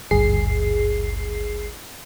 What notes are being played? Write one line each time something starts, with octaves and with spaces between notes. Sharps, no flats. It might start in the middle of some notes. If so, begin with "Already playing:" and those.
G#1 D2 G2 G#4 C7